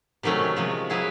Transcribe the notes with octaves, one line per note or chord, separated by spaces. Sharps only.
C3 D#3 F#3 A3 C#4
C3 F3 G#3
C#3 F#3 B3 E4 G#4